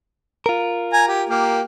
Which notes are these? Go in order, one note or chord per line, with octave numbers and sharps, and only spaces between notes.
F4 A#4
G#5 A#5
G4
A#3 G4